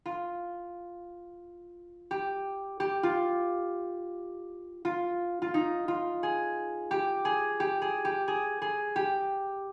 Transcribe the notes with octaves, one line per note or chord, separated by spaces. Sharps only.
F4
G4
G4
F4
F4
F4
D#4
F4
G#4
G4
G#4
G4
G#4
G4
G#4
G#4
G4